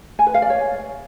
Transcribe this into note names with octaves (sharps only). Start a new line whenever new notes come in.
G#5
B4
F5
D5
C#5